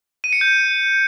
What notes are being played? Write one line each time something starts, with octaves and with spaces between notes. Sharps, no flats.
D#7
C#7
G6